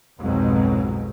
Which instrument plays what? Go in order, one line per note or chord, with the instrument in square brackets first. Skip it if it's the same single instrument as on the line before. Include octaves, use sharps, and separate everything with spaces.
[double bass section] B1 F2 G#2 B2 F#3 G#3